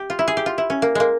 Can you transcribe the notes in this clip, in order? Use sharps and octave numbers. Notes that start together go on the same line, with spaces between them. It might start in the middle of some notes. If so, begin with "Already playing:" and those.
Already playing: G4
F4
E4
G#4
G4
F4
E4
C#4
A#3
G#3 A#3